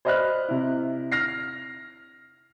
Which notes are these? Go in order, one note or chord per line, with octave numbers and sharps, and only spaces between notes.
C5 D5 D#5 B5 F6 F#6
C3 E4
F6 A#6 C7